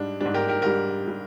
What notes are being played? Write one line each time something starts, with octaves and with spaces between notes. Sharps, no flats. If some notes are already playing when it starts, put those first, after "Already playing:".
Already playing: G#2 G3 D4
G#2 G3 D4
G4 A#4
G4 A#4
G#2 G3 G4 A#4
G3